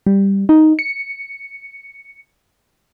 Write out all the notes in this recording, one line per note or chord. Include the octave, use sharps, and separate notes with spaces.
G3
D#4
C#7